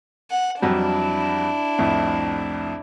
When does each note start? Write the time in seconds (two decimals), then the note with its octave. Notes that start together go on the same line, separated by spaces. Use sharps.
0.31 F#5
0.62 F2 F#3 G3 D4 E4
1.78 C2 F2 A2